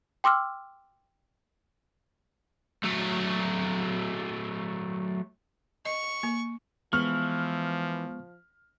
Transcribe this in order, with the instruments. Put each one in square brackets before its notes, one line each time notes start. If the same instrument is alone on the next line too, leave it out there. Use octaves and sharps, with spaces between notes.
[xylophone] G5 C6 D6 E6 F6
[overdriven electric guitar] F#3 A3
[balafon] D#5 [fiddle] C#6
[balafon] A#3
[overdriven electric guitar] E3 [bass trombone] F3 [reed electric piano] G#3 B3 C#6 [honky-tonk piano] F6